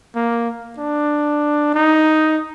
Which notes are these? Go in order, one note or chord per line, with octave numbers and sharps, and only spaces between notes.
A#3
D4
D#4